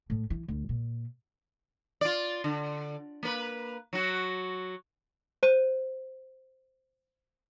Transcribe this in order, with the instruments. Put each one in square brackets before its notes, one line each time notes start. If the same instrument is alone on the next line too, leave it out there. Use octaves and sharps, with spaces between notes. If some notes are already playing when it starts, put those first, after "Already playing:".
[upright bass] A2
E3
D2
A#2
[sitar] F4 D5
D3
A#3 B4
F#3 F#4
[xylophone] C5 D#7